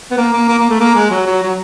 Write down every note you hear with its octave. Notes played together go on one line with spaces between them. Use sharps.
B3
A#3
A#3
A#3
A#3
A3
A#3
G#3
F#3
F#3
F#3